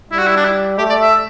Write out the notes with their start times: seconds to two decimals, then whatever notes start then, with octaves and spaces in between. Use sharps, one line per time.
0.11 G3 E4
0.19 F#4
0.28 E4
0.36 D4
0.45 E4
0.78 A3 G4
0.89 D5
1.01 E5